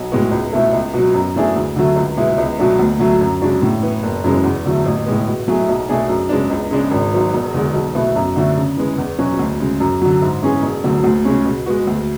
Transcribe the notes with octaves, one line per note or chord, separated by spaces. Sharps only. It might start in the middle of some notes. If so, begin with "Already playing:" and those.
Already playing: B1
A2 G#3 B3 F#4
C#2
B2 A3 E4 A4
C#2
B2 F#3
F#2
E3 A3 D4 G#4
D2
D3 F#3 A3
C#2
B2 G#3 B3 E4
C#2
B2 F#3 A3 D4
D2
D3 F#3 A3
F#2
C#3 G#3 D4 F#4
A2
E3 B3
F#1
F#2 C#3 E3 G#3
E2
D3 F#3 A3
A1
A2 G#3 B3
B2
F#3 A3 E4 G#4
B1
B2 A3 D4 G#4
F#2
C#3 G#3 B3 D4
C#2
C#3 G#3 D4
G#1
G#2 F#3 B3
E1
E2 D3 G#3
B1
B2 A3 E4 B4
F#2
D3 A3 D4 F#4
C#3
E3 G#3 B3
E2
B2 F#3 C#4 F#4
D2
C#3 G#3
F#2
D3 F#3
G#2
E3 G#3 C#4 G#4
E1
D2 D3 F#3
D2
C#3 G#3 C#4
B2
G#3 B3 F#4
D2